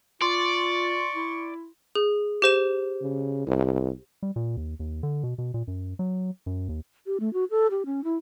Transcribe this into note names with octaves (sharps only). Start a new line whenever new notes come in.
F4 D5 C6 C#6
E4
G#4
G4 C5 E7
C#3
C2
G3
A#2
D#2
D#2
D3
B2
B2
A#2
F#2
F#3
F#2
D#2
G4
A3
F#4
A4
G4
C#4
E4